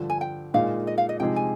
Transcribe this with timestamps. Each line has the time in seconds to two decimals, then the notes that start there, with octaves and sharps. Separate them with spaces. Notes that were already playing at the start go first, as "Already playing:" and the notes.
Already playing: G2 D3 F3
0.10 G#5
0.21 G5
0.54 A#2 G#3 D#4 G#4 F5
0.87 D#5
0.98 F5
1.09 D#5
1.20 C3 F3 G#3 D#4 G#4 G5
1.36 G#5